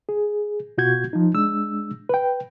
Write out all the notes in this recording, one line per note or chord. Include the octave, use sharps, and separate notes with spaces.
G#4
B2 F4 F#4 G6 G#6
F3 D#4
G#3 D4 E6
B4 G5